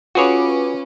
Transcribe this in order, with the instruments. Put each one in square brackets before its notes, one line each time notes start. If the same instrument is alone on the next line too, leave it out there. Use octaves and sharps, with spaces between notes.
[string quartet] C#4 [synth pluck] F4 B4 D6 [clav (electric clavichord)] F#4 G#4 C#5